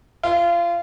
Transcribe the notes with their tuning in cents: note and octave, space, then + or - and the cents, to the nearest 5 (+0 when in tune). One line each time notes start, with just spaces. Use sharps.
F4 -25